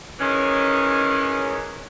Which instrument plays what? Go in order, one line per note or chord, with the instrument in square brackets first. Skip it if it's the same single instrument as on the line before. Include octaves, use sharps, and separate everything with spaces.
[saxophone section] D#3 E3 G#3 C#4